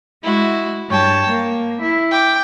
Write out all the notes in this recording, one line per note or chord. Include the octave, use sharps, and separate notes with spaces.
G#3 E4 F#4
G2 C#5 G5 A5
A#3
E4
G5 D6